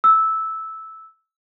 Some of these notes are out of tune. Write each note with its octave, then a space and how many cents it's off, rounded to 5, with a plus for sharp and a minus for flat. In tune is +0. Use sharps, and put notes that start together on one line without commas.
E6 -10